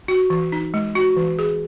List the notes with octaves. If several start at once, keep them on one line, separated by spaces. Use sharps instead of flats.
F#4
E3
D#4
G#3
F#4
E3
G#4